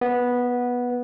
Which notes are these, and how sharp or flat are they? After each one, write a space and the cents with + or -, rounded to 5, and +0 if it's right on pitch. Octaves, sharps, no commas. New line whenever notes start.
B3 -10